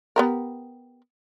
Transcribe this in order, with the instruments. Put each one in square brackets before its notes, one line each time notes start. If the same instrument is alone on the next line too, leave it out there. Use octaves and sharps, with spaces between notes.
[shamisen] B3 G4 A#4